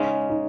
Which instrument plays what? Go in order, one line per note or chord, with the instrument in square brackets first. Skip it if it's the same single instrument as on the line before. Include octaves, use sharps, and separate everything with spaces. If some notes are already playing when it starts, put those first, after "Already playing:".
Already playing: [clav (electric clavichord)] C#3 G#3 C#4 [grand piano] D#4
[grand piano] D#4